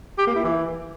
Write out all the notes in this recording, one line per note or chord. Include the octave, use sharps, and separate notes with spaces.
G4
A#3
E4
E3